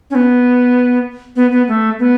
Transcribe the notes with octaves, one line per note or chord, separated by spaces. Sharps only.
C#4
B3
B3
B3
A3
B3